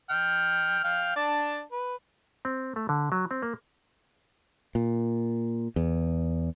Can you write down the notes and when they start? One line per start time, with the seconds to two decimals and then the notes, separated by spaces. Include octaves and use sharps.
0.10 G5 F6
0.84 F5 G5 F6
1.16 D4 D5 A5
1.72 B4
2.45 C4
2.76 A3
2.89 D3
3.12 F#3
3.31 C4
3.42 A#3
4.75 A#2
5.76 E2